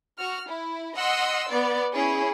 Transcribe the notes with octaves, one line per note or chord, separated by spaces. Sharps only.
F#4 F6
E4
D#5 F#5 C6 E6
B3 D5
C#4 E4 G#4